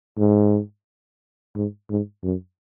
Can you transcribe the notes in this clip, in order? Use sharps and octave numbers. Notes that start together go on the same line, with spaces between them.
G#2
G#2
G#2
F#2